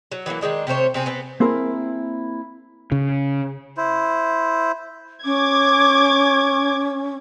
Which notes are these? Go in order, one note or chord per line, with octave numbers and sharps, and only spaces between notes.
F#3
E3 F#3 G#3 A#3
D#3 F3 G#3 D4
C3 A3 C5 C#5
C3 C4 G#4
B3 C4
A#3 C4 E4 G#4 A#4
C#3
E4 C5
C#4 D6 G#6